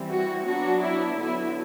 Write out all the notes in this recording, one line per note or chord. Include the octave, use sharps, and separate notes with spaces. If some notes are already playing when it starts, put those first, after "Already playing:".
Already playing: E3 G3 C4
F#4
F#3 B3 D4 F#4
E4
D3 F#3 B3 E4